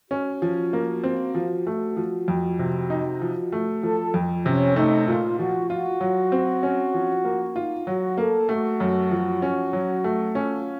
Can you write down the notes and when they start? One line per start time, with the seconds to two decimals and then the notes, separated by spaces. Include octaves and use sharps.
0.11 C#4 F#4
0.42 F3
0.73 A#3
1.04 C4
1.35 F3
1.67 A3
1.97 F3
2.28 F2
2.59 C3
2.90 D#4
3.22 F3
3.52 A3
3.83 F3 A4
4.14 F2
4.46 C3 C#4
4.76 A3 D#4
5.08 A#2 F4
5.39 F3 F#4
5.69 F4 F#4
6.01 F#3
6.32 C4
6.63 C#4
6.94 F3
7.25 A#3
7.56 D#4 F4
7.86 F#3 F#4
8.18 A#3 A4
8.49 A3 F#4
8.80 F#2
9.11 F3
9.42 C#4
9.73 F#3
10.04 A3
10.35 C#4 F4